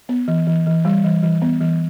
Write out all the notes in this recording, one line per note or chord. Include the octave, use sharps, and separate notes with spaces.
B3
E3
E3
E3
G3
E3
E3
B3
E3